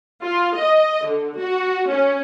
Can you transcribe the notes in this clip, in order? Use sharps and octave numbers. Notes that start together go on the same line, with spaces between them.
F4
D#5
D3
F#4
C#4